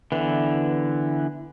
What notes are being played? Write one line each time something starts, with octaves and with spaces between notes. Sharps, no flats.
D3 E3 B3